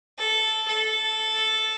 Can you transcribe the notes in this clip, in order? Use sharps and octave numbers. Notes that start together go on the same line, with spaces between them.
A4
A4